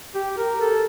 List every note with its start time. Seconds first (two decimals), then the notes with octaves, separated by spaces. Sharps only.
0.15 G4
0.38 A#4
0.61 A4